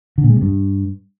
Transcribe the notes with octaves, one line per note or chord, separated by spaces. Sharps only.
D3
A#2
G#3
C3
G2